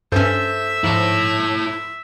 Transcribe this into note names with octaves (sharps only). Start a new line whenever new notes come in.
G2 C#4 A4 C5 E5 G6
G#2 F3 E4 A5